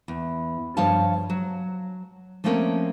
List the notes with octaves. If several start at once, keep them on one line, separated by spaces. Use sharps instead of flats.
E2
G2 C#3 F3 C#5 F5 A5
F#3
F3 A3 A#3 C4 C#4 A#4